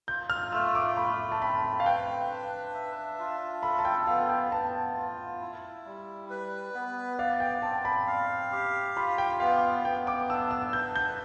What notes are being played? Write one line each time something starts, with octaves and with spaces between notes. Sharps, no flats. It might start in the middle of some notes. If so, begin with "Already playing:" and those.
F4 G6
F6
A3 E6
D6
A3 B5
A5
C4 B5
F5
B4 G5
D4
E5
F4
A4 B5
A5
G5
B3 F5
G5
B3 A5
F4
E4
G3
B4
B3
D5 F5
G5
C4 A5
B5
F5
G4
F4 B5
G5
B3 F5
B3 G5
D6
D4 E6
E6
B4 G6
G6